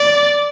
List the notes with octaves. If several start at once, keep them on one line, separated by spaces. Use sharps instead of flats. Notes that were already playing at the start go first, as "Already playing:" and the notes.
Already playing: D5